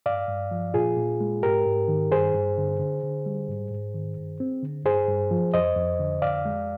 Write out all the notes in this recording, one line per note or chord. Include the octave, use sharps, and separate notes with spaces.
G2 D5 F5
G2
F3
A#2 F4 G#4
A#2
G#3
G#2 G4 A#4
G#2
D#3
G2 G#4 C5
G2
D3
D3
D3
G3
G#2
G#2
D#3
G2
C4
D3
G2 G#4 C5
G2
F3
F2 C5 D#5
F2
D3
F2 D5 F5
G#3